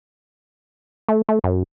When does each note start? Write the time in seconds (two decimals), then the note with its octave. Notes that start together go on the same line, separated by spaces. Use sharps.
1.08 A3
1.29 A3
1.44 F#2